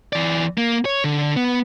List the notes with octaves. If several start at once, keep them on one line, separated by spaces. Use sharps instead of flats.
E3 D5
A#3
C#5
D3
B3